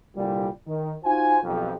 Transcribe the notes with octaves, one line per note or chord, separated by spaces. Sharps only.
C2 A#2 D3 G3
D#3
D#4 F4 F#4 C5 G#5
B1 F2 G4